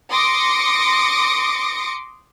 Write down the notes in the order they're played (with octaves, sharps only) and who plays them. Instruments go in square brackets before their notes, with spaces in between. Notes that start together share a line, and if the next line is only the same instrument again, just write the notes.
[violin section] C6 D6 D#6 A#6 C#7 D7